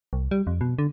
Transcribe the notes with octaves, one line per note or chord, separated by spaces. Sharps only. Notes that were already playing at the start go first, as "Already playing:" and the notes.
C2
G3
F2
B2
D3